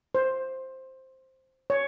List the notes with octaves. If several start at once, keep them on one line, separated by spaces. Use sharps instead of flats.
C5
C#5